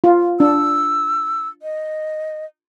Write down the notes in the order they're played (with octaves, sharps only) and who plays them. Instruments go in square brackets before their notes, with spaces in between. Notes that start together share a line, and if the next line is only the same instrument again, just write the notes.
[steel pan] F4
[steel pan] D4 [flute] E6
[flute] D#5